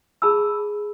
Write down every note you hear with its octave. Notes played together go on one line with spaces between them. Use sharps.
G#4 A5 B5 E6